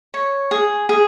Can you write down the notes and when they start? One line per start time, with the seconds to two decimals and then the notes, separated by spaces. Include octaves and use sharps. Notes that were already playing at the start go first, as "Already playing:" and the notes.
0.14 C#5
0.51 G#4
0.89 G#4